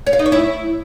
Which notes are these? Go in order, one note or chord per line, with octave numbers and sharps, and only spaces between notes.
C#5
F5
D#4
C#5
E4